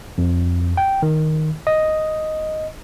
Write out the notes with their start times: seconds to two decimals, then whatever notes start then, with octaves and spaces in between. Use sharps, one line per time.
0.18 F2
0.77 G5
1.02 D#3
1.67 D#5